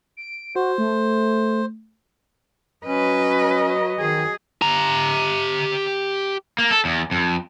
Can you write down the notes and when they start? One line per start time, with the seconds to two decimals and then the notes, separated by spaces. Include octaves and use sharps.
0.17 D7
0.56 F#4 C5
0.78 A3
2.86 F#3 C#4 B4 D#5
3.99 D#3 G#4
4.62 G4 A#5
6.58 A#3
6.71 A4
6.85 E2
7.11 F2